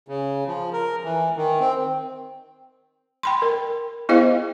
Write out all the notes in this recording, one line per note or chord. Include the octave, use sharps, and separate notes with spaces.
C#3
F3
A#4
E3
D#3
C4
G5 B5 C6
A#4
B3 E4 G#4 C5 D#5 F5